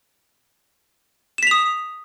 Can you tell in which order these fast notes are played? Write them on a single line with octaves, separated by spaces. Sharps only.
E7 B6 F7 D#6